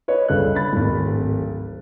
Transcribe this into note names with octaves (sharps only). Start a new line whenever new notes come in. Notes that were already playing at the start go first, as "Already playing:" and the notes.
B4 C#5 D#5
G1 C#2 G3 F#6
B5 A6
D1 G#1